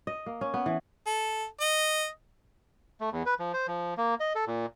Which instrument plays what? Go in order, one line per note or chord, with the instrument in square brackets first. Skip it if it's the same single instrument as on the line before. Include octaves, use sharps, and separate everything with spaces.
[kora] D#5
A#3
C#4
B3
E3
[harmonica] A4
D#5
[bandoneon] A3
E2
B4
F3
C5
F3
A#3
D#5
A4
A#2